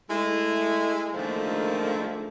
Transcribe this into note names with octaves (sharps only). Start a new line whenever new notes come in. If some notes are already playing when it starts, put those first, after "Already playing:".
G#3 A3 E4
A#2 D3 D#3 F3 G#3 A3